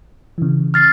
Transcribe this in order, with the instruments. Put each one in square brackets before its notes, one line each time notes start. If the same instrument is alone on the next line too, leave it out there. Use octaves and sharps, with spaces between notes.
[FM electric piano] C#3 E3
[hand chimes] F6 A6 C7